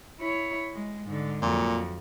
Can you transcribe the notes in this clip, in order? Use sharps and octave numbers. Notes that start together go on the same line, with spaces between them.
E4 C#5
G#3
G#2 D3
F2 A#2 F#3